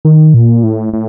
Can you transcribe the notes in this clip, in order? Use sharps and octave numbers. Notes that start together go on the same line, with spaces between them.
D#3
A#2
A2
A2